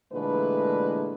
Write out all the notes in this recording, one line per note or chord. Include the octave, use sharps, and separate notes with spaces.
A#2 D3 E3 G#3 A3 B4